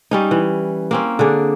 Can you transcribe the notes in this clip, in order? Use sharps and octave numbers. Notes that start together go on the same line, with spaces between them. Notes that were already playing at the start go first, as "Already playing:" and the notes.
G3 C#4 D#4
E3
A#3 C4 C#4
D3 D4 G#4